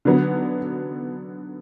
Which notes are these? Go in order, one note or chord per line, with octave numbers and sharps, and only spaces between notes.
D3 F#3 B3